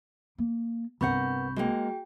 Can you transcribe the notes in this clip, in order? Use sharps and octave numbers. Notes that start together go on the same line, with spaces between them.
A#3
C2 G2 B3 A#4 F#5 B5 C#6 G6
G#3 A#3 F#4 G#4 G5